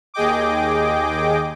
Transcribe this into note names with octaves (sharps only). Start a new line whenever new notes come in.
D#2 G#4 D#5 G5 D6